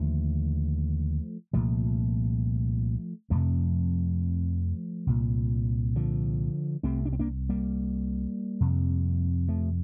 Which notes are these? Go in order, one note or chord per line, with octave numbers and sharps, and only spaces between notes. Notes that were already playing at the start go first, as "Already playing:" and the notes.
Already playing: D#2 D3 F3 A3
C2 A#2 F3 A3
F2 C3 F3 A3
C2 A#2
D3 F3
C2 C3 A3 C4
D4
C4
A#3 D4
G3 A#3
F2 C3
F3 A3